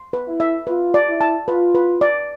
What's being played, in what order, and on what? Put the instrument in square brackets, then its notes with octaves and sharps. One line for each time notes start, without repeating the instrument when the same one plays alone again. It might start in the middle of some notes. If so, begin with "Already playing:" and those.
Already playing: [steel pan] C6
B4
[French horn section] E4
[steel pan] E5
[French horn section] F4 [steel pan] B4
[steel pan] D5
[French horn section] E4
[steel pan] A5
[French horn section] F4 [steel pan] B4
[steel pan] B4
D5